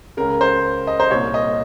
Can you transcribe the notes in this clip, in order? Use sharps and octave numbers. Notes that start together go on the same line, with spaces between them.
C#2 C#3 A#4
C5
D#5
C5
C2 A#2 C#5
D#5